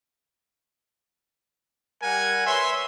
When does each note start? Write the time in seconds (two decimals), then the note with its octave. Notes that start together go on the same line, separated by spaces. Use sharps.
2.02 G3 A#4 F#5 G#5
2.46 B4 C#5 E5 C6